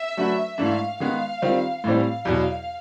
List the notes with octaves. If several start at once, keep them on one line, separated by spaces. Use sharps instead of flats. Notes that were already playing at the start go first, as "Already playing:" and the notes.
Already playing: E5
F#3 A3 D4 F#4 B4
G#2 E3 A3 D4 F5
D#3 G#3 B3 F5
D#3 G3 C4 F4
A2 E3 G3 C4 F5
E2 B2 F#3